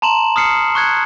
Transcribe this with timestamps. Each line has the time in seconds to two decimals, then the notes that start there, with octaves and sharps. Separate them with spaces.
0.02 A5 A#5 C6 E7 F#7
0.36 D#6 F6 C7 C#7
0.75 C#6 F#6 G#6 C#7